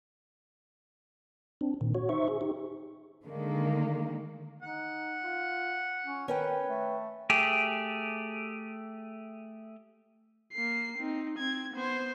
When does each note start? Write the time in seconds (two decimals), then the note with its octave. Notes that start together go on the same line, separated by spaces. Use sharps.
1.61 C4 D4
1.81 A#2 D#3
1.95 F#4 C#5
2.09 D#4 C5 E5 C#6
2.28 G#4
2.41 D#4 G4
3.25 D3 D#3 G#3 A#3
4.62 D#4 F#5
5.23 F4
6.06 C#4
6.28 D#3 C#4 B4 G5
6.69 A3
7.30 A3 G4 G#4
10.53 A#3 C7
10.98 C4 D#4
11.38 C4 G#6
11.74 B3 C5